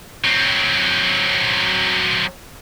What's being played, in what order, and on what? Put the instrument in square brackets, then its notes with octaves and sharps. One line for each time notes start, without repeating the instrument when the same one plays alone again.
[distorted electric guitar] F#3 C4